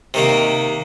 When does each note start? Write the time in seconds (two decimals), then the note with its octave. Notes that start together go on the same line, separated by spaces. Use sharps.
0.14 C3 D#3 A#3